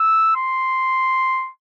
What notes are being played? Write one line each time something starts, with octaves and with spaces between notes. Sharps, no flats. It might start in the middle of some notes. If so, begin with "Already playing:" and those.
Already playing: E6
C6